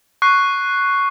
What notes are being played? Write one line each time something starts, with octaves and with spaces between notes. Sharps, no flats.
C#6 F#6 C7